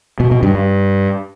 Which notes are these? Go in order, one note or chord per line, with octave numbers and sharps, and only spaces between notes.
B2
B2
G2
G2